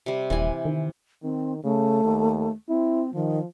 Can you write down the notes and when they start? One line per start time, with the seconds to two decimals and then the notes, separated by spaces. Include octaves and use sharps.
0.06 C3 G3
0.30 D#1 E3 G#5
0.65 D#3
1.23 D#3 C4
1.64 C#3 A3
2.05 D#2
2.69 C4 E4
3.14 D#3 F3